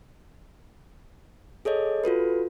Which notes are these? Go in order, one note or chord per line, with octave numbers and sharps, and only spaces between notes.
G#4 A4 C#5 D#5
F4 F#4 A4 B4